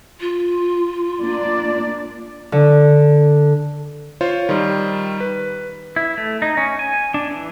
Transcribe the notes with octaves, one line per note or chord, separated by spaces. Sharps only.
F4
A#3 D4 D5
D3
F4 C5 C#5
D#3 G3
B4
E4
A3
D#4
C#4
G#5
D4
E3